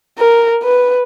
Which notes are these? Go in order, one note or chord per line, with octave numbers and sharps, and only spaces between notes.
A#4
B4